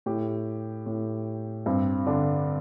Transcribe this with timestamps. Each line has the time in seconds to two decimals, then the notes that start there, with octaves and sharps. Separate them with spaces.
0.06 A2 G4
0.86 A2
1.66 G2 C4
2.06 D3 D4